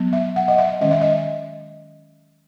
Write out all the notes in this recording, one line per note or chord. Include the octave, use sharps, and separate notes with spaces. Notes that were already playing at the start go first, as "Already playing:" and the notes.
Already playing: F#3 B3
E5
F#5
D#5
E5
D#3 G#3 C#4 D#5
E5
D#5